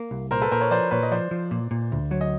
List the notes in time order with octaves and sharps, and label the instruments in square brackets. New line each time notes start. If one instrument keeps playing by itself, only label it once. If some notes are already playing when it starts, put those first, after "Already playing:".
Already playing: [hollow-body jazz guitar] A#3
C2
[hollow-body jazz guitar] A#2 [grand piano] A#4 C5
[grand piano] A4 B4
[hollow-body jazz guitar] A#2 [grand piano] A#4 C5
[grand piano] B4 C#5
[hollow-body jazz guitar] F3 [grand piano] C5 D5
[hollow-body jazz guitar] A#2 [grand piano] B4 C#5
[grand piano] D#5
[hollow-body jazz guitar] F3 [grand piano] C5 D5
[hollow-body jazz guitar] F3
A#2
A#2
D2
F#3
[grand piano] D#5